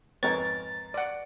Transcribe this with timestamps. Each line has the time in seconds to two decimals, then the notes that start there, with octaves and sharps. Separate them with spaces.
0.23 F2 G#2 A#4 B4 C#5 A6
0.94 D5 F#5